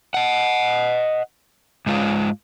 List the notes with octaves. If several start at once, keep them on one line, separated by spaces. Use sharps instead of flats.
D#5 F#5
G#2 G#3 F4 F5